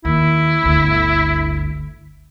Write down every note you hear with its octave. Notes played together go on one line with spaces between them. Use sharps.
D#2 E4
G1 D2